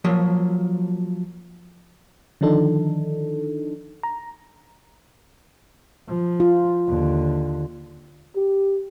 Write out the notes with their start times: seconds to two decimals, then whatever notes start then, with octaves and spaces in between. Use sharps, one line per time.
0.04 F3 F#3 A#3
2.41 D3 D#3 F3 D4 D#4 A4
4.03 A#5
6.08 F3
6.40 F4
6.88 D#2 D3
8.36 G4